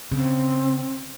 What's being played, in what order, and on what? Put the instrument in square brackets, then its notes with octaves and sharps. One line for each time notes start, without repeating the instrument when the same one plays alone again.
[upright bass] C#3 [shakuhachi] C4